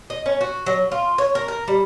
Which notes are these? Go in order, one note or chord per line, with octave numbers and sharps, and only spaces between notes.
D#5
C#4
F#4
F#3
F4
C#5
A#4
A#4
G3